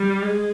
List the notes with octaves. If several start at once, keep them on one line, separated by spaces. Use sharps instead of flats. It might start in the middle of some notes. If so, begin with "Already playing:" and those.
Already playing: G3
G#3